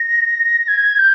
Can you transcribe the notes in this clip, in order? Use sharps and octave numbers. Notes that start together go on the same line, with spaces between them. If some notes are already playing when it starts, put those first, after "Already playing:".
Already playing: A#6
G#6
G6